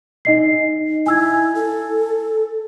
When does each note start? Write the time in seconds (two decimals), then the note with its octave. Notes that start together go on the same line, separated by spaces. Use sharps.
0.25 D#4 D#5 C7
1.06 E4 G#5 E6 G#6
1.55 A4